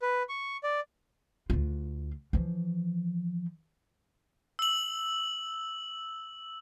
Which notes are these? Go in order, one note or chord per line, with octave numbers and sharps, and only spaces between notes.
B4
C#6
D5
D2 F4
E3 F3
E6 F#7